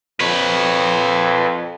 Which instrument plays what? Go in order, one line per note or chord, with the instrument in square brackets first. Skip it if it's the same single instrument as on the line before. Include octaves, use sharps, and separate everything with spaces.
[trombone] F2 [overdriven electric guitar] B4 C#5